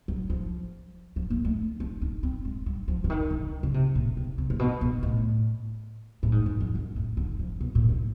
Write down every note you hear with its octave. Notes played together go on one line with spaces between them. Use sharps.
F#3
F3
F3
A#3
A3
D4
D#4
C4
G#3
G3
F3
D3
D#3
D3
C#3
C3
A#2
B2
C3
A#2
B2
B2
A2
A2
G#2
F#2
F2
F#2
A2
D3
F3
B2
A#2
A2